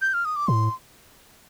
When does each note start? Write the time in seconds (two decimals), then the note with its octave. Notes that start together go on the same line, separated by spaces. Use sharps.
0.01 G6
0.14 F6
0.25 D#6
0.36 D6
0.48 A2 C6